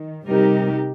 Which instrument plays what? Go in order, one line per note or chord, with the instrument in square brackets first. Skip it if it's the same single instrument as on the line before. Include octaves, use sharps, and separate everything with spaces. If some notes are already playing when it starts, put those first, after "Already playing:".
Already playing: [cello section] D#3
C3 G3 D#4 G4 A#4